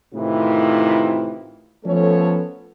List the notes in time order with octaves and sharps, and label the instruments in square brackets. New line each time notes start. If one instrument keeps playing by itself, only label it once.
[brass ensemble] A2 C3 D#3 E3 E4 F4
F3 A3 B3 C#4 A4 C#5